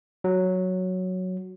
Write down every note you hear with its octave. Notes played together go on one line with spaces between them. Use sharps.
F#3